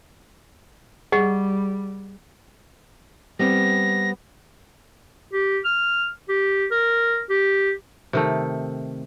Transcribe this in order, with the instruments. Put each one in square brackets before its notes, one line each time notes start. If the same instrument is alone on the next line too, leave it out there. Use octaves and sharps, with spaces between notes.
[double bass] G3 [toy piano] G#4 D#5 F#5
[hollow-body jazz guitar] G3 B3 C4 [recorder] A#6
[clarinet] G4
F6
G4
A#4
G4
[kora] C3 D#3 A3